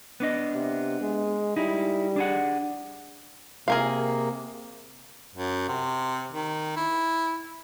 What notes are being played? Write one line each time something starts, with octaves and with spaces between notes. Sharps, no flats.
B3 D4 D#5
C3
G#3
G3 D#4 E4
D4 G#4 F#5
C3 A#3 G#4 A#4 F5
F#2
C3
D#3
E4